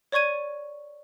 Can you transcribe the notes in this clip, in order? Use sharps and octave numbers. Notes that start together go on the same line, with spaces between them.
C#5 D5 C#6 G#6 D#7